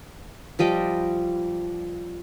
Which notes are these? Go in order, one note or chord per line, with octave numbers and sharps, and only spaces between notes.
F3 G3 D#5 G5